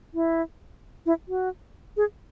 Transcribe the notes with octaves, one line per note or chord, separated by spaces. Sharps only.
E4
E4
F#4
G#4